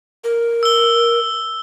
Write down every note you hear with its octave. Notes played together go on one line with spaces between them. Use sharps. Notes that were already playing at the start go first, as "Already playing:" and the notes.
A#4
E6 G7